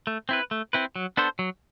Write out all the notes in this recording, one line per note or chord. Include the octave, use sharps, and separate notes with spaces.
A3
C4 E4 B4
A3
C4 E4 B4
F#3
B3 D4 A4 C5
F#3